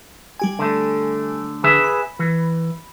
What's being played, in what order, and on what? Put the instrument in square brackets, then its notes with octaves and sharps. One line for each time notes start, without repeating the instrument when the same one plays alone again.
[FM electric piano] G3 G4 G#5
[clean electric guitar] D3 A3
[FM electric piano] D3 [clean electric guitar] G#4 B4 E5
[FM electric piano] B5
[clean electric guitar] E3